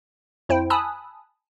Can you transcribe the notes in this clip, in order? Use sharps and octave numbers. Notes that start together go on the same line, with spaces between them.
F2 E4 C5 G5
G#5 A5 B5 D#6 E6 F#6